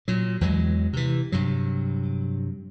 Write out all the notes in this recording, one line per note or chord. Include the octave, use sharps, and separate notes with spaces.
A#2 F#3
E2 E3 F#3 G#3
C3 E3
G2 C3 F#3